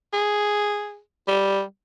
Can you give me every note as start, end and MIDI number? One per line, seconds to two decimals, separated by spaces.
0.13 0.99 68
1.28 1.61 55